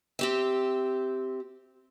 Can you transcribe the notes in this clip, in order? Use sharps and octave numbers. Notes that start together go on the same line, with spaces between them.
C4 G4 E5